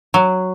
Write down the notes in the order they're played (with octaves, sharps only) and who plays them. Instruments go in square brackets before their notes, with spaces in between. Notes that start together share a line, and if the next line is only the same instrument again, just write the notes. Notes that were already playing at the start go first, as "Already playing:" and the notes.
[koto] F#3